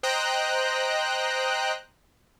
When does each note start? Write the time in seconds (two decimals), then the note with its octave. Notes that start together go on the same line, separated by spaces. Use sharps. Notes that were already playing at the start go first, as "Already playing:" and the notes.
0.03 C5 D#5 G5 A#5 F#6